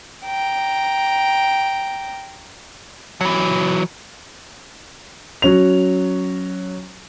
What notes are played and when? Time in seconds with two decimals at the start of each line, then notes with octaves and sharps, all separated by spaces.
0.25 G5 A#5
3.21 E3 F#3
5.42 F#3 C#4 F7